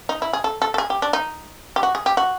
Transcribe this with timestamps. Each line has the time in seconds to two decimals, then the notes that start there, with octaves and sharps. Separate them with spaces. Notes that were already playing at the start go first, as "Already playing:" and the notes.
0.09 D#4
0.22 E4
0.33 G#4
0.44 A4
0.62 A4
0.74 A4
0.78 G#4
0.90 G4
1.02 D4
1.13 D#4
1.76 G4
1.83 F#4
1.95 G#4
2.06 G4
2.17 F#4